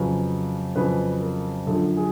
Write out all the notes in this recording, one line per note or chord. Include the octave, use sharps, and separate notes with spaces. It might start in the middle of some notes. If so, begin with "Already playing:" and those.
Already playing: F2 C#3 F#3 B4
F2 C#3 F#3 B4
A#4
F#2 D3 F3 A4
G#4